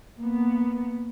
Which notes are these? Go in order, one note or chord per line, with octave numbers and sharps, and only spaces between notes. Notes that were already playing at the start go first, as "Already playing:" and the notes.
A#3 B3